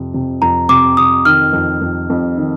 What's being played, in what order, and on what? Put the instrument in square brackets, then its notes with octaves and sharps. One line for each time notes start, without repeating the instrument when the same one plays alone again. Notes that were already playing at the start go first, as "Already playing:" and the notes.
Already playing: [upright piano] F2 C3
C3
[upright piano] F2 [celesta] A#5
[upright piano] C3 [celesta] D6
[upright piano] C3 [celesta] D#6
[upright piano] D#3 [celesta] F6
[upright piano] F2
F2
F2
D#3